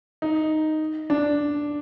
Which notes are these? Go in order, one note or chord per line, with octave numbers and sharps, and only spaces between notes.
D#4
D4